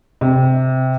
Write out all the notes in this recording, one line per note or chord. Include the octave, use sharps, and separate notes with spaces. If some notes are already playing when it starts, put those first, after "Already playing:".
C3